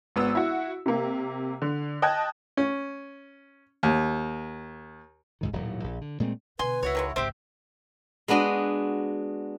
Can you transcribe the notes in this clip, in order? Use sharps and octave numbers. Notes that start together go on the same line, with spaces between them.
G#1 B3 E6
E4 F#4
C3 A#3
D3
D#5 G5 A5 F#6 G#6
C#4
D#2
C#2 G#2 D#3
D#1 A2 F#3
A#1
D3
A#2 G#3 A3 C4
B2 D3 B4 G#5 C6
C#2 E4 F#4 C#5
D#3 F#3 G#3
G#1 C#2 C4 G4 C5 E5
G#3 B3 D4 F#4 D#5